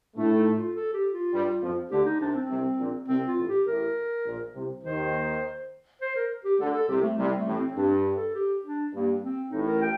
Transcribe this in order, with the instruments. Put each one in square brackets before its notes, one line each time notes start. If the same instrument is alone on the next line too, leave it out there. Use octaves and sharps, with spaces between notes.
[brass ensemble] A2 A3 [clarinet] D4
[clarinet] D#4
F4
A4
G4
F4
[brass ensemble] G2 G3
F2 F3
[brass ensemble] D2 D3 [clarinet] G4
[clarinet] D#4
[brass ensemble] C2 C3 [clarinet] D4
[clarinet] C4
[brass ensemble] C2 C3
A#1 A#2
[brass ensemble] C2 C3 [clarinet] C4
[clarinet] F4
[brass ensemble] A1 A2
[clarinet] G4
[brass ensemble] A1 A2 [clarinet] A#4
[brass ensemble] A#1 A#2
C2 C3
[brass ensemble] D#2 D#3 [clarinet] C5
[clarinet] C5
A#4
G4
[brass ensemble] D2 D3 [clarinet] A4
[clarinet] A4
[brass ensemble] C2 C3 [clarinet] G4
[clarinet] A3
[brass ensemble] C2 C3 [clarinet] G3
[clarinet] A3
[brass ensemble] A1 A2
[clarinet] C4
[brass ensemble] G2 [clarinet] D4
[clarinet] A4
G4
D4
[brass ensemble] G2 [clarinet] A#3
[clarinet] C4
[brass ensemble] A1 A2 [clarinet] D#4
[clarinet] A#4
G5